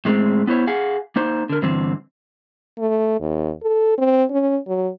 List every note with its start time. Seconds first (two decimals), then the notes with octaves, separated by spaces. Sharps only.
0.05 A2 G#3 C4
0.47 B3 E4 C5 C#5
0.67 G#4 F5 F#5 G#5
1.16 A#3 D#4 C5
1.49 D3 A#4
1.62 G2 D3 E3 C4
2.79 A3
3.21 D#2
3.63 A4
3.98 C4
4.30 C#4
4.68 F#3